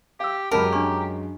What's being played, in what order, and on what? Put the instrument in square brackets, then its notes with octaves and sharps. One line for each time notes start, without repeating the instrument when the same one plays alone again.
[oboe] G4 [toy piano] F5 E6
[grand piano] F#2 G#3 C#4 [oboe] G4 [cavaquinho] A#4 [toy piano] F#5 A5 B5
[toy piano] D4 G#5 C#6